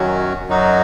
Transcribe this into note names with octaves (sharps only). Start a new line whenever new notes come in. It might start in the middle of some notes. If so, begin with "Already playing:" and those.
Already playing: F#2 D#3 F#3 C#4 F#4
F#2 F#3 D#4 F#4